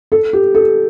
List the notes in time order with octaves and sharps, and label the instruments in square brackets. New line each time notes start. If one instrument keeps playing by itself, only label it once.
[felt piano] A4
G4
A4